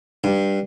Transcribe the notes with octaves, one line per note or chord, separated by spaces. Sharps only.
G2